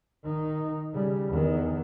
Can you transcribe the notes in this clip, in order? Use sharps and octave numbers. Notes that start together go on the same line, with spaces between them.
D#3 D#4
C#3 G3
E2 D#3